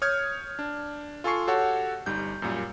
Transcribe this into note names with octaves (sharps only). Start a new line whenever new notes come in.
C#5 D#6 F6 G6 G#6
D4
F4 A4 G#5 C6 C#6 C7
F#4 G4 A4 C#5 F#5
G1 G3 D#4 G6
F#2 A#2 G3